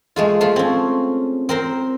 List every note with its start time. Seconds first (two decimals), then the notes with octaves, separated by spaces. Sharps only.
0.16 G#3 A3 F4
0.41 F3 A3 F4
0.56 C4 C#4
1.49 C4 A#4 C5